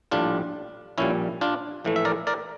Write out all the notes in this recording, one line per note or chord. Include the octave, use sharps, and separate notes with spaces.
A#1 A2 G3 D4 F4
A#1 A#2 G3 C#4 E4
D4 F4
A#1 A2 E3 A3
E5
A#4 D5
A#4 D5